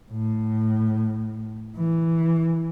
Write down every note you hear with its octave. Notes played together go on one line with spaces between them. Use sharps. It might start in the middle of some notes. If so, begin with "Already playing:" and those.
A2
E3